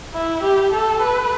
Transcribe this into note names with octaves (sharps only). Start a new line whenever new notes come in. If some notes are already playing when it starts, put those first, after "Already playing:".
E4
G4
A4
B4